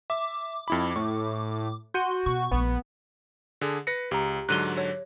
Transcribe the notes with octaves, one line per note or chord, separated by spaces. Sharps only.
E5 D6
F2 E4 B5
A2 C#6
F#4 C6 G6 C#7 D#7
B2 C#6
A#1 A3 B3
D3 G#4
B4 A#6 C#7
C#2 G4 A#5
G#2 D3 F#3 F#6 D#7 G7
C#5